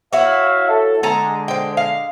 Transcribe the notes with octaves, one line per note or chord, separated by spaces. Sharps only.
E4 F#4 C#5 E5 F5
A4
D3 G#3 A4 G#5 A#5
C5 G5
F5